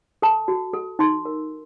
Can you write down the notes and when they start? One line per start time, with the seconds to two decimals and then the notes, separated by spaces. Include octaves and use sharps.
0.22 A4 A5
0.48 F#4
0.73 A4
0.99 D#4 C6
1.25 A#4